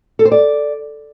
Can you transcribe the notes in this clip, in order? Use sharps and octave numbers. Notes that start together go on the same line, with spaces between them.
A4
C5
D5